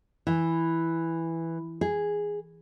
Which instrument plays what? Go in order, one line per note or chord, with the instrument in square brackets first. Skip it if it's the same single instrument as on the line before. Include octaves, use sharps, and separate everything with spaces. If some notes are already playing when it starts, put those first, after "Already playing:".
[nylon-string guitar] E3
G#4